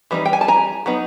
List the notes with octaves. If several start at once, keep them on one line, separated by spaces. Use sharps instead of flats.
E3 G3 C4 D#4
G5
G#5
A5
G#5 A#5
F#3 B3 D#4